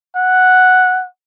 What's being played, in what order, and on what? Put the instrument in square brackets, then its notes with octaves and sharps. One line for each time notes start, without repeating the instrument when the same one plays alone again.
[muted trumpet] F#5